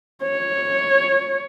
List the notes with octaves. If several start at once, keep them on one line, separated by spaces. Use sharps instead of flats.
C#5